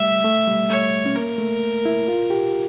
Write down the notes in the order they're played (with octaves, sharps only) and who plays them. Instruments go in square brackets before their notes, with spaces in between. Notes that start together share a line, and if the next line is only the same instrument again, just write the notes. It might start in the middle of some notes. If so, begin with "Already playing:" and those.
Already playing: [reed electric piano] G3 A3 [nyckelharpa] E5
[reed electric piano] A3
G3
[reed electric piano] A3 [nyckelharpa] C#5
[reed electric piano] C#4
[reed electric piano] A#3 [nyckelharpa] A#4
[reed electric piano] A3
E4
F4
G4